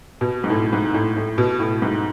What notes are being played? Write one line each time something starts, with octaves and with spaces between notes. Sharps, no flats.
B2
G#2
A2
G#2
A2
A2
B2
A2
G#2